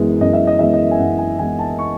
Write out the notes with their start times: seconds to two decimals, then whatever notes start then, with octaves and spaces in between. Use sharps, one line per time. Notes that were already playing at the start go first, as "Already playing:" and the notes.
Already playing: F#2 E3 G#3 B3
0.21 F#2 D#5
0.33 E5
0.47 D#5
0.59 E3 G#3 B3 E5
0.73 D#5
0.91 G#5
0.99 F#2 F#5
1.18 G#5
1.39 E3 G#3 B3 G#5
1.59 A5
1.79 C#6